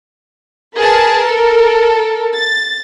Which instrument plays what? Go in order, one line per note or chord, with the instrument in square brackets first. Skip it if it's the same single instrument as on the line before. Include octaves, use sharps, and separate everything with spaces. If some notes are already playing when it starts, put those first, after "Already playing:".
[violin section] G#4 B4 A5 [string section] A#4
[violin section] A4
A6